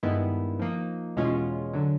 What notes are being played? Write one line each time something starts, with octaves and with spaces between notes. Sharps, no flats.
G2 D#3 G#3 B3 E4
F3 A#3 D#4
E2 B2 G#3 C#4 F4
D3 F#3